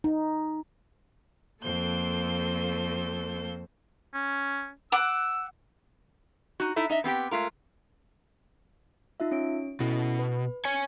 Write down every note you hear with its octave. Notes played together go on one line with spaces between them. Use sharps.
D#4
F2 A#3 A4 C5 G6
C#4
F#5 D6 E6
D#4 F#4
D#4 E4 A4 E5
D#4 D#5 E5
B3 C4 G4 G5
G#3 A3 F4 A#4
D#4 F4 E5
C#4 C#5 D7
B2 C#4 E4 A4
B4
C#5 G#5 G#6